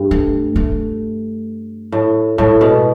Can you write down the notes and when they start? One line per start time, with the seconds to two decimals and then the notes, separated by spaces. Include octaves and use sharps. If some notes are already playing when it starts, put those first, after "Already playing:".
Already playing: G2
0.11 A3
0.56 A3
1.92 A2
2.38 A2 G#3
2.61 B2